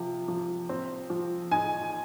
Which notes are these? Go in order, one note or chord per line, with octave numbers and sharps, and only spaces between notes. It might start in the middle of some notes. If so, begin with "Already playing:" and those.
Already playing: C3 F3
F3
C4
F3
D#4 G#5